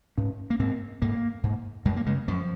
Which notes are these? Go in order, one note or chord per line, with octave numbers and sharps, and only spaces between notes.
G#2 C#4
A#3
G#2 C4
G#2 A#3
G#2
F#2 G#3
A#3
C#3 G#3
F#2 F3